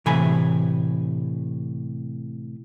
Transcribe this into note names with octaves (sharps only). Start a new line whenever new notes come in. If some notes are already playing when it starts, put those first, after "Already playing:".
A2 C3 E3 A3 G#5 B5